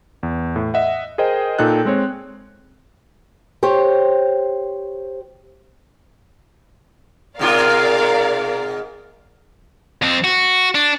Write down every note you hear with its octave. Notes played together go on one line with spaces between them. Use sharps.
E2
A2
D#5 E5 F#5
G#4 A#4 C5 D#5 G5
A#2 D#4 A4 G5 F#6
G#3 C4 C#5
G4 C5 C#5
G#2 B2 F4 A#4 D5 F5
F2 C4
F#4
D4